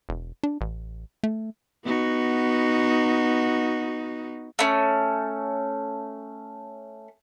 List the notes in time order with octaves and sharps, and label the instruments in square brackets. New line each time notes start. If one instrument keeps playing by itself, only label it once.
[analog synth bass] E1
D4
A1
A3
[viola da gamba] B3 D#4 F#4
[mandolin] A3 C#4